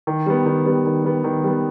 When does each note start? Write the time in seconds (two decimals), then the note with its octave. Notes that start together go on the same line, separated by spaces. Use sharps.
0.07 D#3
0.26 G3 B3
0.46 D#3
0.66 G3 B3
0.86 D#3
1.04 G3 B3
1.24 D#3
1.44 G3 B3